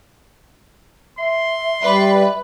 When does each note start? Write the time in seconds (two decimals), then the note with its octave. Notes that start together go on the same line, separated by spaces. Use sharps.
1.18 E5 C6
1.83 G3 B4 D5